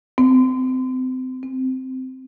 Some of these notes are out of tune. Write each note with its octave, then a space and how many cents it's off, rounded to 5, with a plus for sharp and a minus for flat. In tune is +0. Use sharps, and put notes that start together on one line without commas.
C4 -30
C4 -10